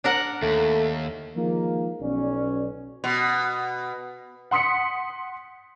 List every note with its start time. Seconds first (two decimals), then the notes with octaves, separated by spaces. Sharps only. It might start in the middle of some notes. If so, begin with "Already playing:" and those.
0.04 D4 A#4 F#5
0.43 D#2 A3
1.36 D#3 F3 G#3 A#3
2.01 B1 C#4 D5
3.04 B2
4.51 F#5 C6 D#6 B6 C#7